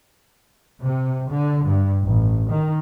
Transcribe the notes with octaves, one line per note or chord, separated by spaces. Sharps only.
C3
D3
G2
A1
D#3